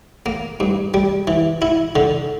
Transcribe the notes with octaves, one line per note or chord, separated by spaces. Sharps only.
A#3
G2
G3
E3
E4
D3